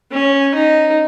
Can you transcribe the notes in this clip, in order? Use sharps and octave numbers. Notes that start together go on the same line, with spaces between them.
C#4
D#4